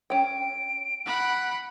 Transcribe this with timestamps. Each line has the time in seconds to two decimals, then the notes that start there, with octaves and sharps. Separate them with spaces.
0.10 C#4 G5 D7
1.06 F#5 B5